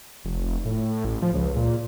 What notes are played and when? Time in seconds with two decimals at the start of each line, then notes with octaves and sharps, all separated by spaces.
0.25 F1
0.65 A2
1.05 A1
1.22 F3
1.34 C#2
1.56 A#2